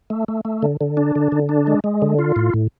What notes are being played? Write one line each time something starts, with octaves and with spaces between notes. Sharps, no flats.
A3
A3
A3
D3
D3
D4
D3
D3
D4
G#3
G#3
D3
F4
A2
A2